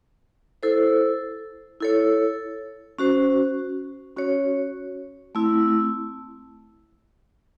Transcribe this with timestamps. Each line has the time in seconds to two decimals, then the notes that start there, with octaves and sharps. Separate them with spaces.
0.63 E4 A4 C5
1.80 E4 A4 C#5
2.99 C#4 F#4 C5
4.16 C#4 F#4 C#5
5.35 A3 C4 E4